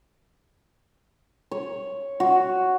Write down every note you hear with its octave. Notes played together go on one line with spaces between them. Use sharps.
C#5
F#4